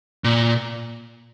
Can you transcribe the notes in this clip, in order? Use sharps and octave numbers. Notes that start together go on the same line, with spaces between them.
A#2